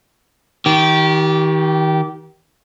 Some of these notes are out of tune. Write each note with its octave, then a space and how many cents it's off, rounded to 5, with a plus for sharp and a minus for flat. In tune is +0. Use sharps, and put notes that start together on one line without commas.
D#3 +30 G4 -20